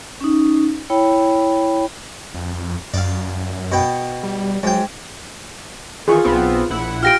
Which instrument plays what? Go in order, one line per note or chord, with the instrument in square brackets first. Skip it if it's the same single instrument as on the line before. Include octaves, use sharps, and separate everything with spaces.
[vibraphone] C#4 D#4
E4 C#5 G5 B5
[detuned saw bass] F2
[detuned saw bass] F#2 [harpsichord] D5 F5
[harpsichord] B2 B3 G5
[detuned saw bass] G3
[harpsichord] G#2 G5 [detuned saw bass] F#3
[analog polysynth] D#3 E3 [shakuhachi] F4 [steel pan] G#4 C#6
[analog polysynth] B1 B3 C4
A#1 E4 F#5
[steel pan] F4 G4 [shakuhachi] G5 [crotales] F6 A#6 D7